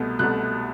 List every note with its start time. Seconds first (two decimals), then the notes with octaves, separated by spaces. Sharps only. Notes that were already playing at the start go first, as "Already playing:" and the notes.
Already playing: C2 B2 A3
0.19 C2 B2 A3 F#6